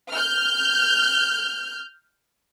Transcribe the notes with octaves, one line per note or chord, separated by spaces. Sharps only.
F6 G6